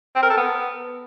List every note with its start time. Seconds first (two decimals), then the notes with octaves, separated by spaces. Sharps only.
0.16 C4
0.23 A#4
0.30 A4
0.37 B3